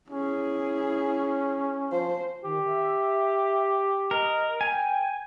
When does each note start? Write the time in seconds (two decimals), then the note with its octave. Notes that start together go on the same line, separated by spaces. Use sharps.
0.10 C#4 E4 G#4
1.92 F3 C5
2.44 D#3 G4
2.66 E5
4.11 A#4 D#5
4.61 G5 G#5